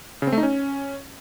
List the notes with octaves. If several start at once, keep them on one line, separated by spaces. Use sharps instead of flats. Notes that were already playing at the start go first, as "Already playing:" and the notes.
C#3
C4
A3
D#4
C#4